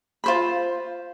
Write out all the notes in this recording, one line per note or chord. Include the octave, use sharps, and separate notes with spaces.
F4 C5 B5